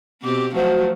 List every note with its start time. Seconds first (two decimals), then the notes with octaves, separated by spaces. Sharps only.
0.23 B2 C4 G4 D6
0.55 F3 F#3 A3 F#4 C5